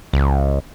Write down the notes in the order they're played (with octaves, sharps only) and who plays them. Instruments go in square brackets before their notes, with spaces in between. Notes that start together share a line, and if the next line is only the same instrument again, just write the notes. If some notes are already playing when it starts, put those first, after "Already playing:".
[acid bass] C#2